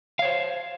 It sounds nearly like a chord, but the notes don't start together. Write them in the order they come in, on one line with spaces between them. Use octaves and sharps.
F5 C#5 C5